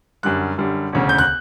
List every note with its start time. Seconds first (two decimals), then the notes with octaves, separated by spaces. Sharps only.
0.23 F#2 D3 G3 F#6
0.58 F#2 D3 G3
0.93 E1 D2 C#3
1.09 G6
1.18 F#6